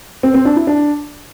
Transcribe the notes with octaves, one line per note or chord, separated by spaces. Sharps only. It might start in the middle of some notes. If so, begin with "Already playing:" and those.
C4
C4
D4
E4
D4